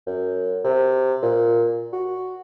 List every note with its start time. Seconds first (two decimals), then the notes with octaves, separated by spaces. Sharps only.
0.07 F#2
0.64 C3
1.22 A#2
1.93 F#4